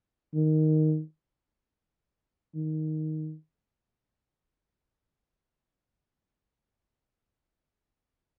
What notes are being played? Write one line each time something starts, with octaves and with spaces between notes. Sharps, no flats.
D#3
D#3